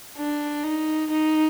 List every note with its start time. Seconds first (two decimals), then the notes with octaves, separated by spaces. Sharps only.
0.18 D4
0.63 D#4
1.10 D#4